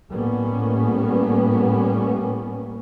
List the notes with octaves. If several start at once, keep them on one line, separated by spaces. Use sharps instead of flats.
A2 G3 A#3 B3 C#4